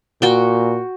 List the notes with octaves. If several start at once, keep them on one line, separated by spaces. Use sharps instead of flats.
A#2 F#4 G5